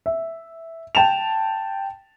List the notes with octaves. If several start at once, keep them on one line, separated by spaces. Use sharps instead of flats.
E5
G5 A5 E7 F7